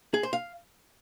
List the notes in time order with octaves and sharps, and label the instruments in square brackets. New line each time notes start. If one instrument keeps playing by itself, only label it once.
[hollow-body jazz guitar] G#4
C5
F5